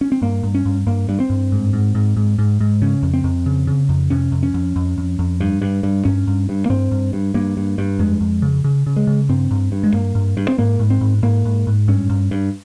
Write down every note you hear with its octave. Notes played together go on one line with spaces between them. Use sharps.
C#4
C4
G2 A#3
G2
C#4
G2
G2 A#3
G2
C4
G2
G#2
G#2
G#2
G#2
G#2
G#2
C#3 C#4
F2
C4
F2
C#3
C#3
F2
C3 C#4
F2
C#4
F2
F2
F2
F2
G2
G2
G2
G2 C#4
G2
G2
A#3
G2 C4
G2
G2
G2 A#3
G2
G2
F2 G#3
F2
C#3
C#3
C#3
G#3
C#3
G2 C4
G2
G2
G#3
G2 A#3
G2
G2
C4
G#2 A#3
G#2
C4
G#2
G#2 A#3
G#2
G#2
G2 C#4
G2
G2